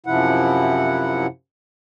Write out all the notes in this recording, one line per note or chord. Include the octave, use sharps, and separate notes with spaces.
F#2 C3 F3 E4 F#5